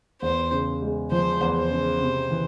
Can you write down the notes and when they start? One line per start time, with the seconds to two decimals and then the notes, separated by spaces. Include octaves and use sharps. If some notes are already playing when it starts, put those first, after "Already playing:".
0.22 E2 C5
0.51 C#3
0.82 G#3
1.11 F3 C5
1.41 E2
1.57 C5
1.70 C#3
2.01 C3
2.31 E3